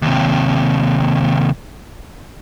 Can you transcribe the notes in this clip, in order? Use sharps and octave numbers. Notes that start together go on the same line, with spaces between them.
D#2 C3